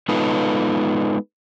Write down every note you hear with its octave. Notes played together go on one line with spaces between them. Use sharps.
G#3 B3 D#4 F4 A4 B4